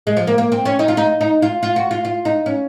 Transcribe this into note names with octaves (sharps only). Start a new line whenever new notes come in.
G#3
F3
A#3
A#3
C4
C#4
D#4
F4
D#4
D#4
F4
F4
F#4
F4
F4
D#4
C#4